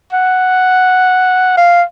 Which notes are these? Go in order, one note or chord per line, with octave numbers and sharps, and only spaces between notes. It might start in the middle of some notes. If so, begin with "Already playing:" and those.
F#5
F5